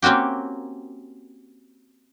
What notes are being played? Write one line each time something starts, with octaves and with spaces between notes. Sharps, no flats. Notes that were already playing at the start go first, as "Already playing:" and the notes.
A#3 C4 C#4 F#4 G4